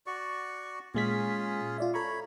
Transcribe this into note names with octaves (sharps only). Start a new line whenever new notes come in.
F#4 D5 C#6
A#2 G#3 C#4 F4 G#4 B6
F4 D5 E5
A4 C#5 A#5 B5 C#6